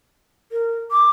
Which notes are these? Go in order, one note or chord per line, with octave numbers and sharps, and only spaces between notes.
A#4
D6